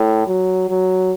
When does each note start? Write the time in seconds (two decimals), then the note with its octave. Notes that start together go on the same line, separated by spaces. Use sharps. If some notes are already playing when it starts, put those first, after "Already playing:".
Already playing: A2
0.27 F#3
0.69 F#3